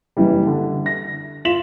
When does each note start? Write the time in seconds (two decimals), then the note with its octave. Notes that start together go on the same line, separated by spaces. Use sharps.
0.17 F#1 E3 G3
0.47 D3
0.86 A#6
1.45 F4 F5 B6 E7 F#7